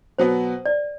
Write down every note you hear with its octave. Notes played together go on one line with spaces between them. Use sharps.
B2 F#3 B3 C5
D5